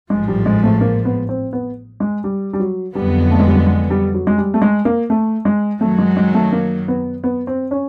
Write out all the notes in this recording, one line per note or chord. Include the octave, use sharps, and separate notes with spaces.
A1 G#2 F3 G#3
G3
G#3
A3
A#3
B3
C4
B3
G#3
G3
G3
F#3
F2 D3 F#3 G3 B3
A3
G#3
G3
G#3
G#3
G3
F#3
G#3
G3
A3
G#3
A#3
A3
G#3
F#2 D#3 F#3 A3
G#3
G#3
A3
A#3
B3
B3
C4
C#4